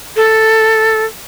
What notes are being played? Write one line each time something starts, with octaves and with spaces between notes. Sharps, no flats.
A4